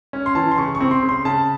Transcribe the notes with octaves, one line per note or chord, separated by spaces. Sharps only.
C#4
C6
E3 A5
C6
C#3 C#6
C#6
C4
C6
C#3
C6
C#3 A5